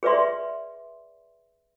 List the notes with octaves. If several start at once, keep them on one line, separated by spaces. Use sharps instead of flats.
G#4 B4 D5 E5 C6